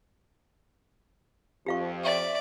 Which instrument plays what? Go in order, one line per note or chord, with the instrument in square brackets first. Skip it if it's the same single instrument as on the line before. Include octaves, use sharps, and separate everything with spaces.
[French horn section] F2 F3 [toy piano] G4 F5 C#6
[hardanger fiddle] D5 [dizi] E5